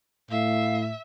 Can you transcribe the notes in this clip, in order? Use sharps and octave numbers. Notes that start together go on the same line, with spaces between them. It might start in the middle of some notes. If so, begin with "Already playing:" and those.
A2 E5 F5